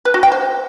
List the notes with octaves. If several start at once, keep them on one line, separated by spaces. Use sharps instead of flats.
B4
F#4
G5
C5